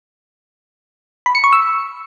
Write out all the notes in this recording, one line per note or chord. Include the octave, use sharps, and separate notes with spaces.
B5
C#7
C#6
E6